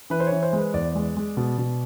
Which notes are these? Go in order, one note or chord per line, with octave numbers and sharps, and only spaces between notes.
E3 B4
C5
C#5
E3
C5
G#3
B4
E2 D5
G#3
G#3
B2
B2